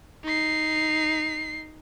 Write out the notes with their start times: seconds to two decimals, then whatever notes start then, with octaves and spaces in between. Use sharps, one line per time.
0.24 D#4 C7